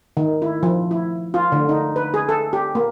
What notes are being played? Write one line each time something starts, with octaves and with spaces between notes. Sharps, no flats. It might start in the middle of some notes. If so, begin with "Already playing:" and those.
D#3
E4
F3
E4
F4
D3
D#4
B4
G#4
A4
G4
A#3